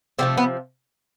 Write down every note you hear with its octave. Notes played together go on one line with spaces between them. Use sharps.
C3 F3 A3 C4
B3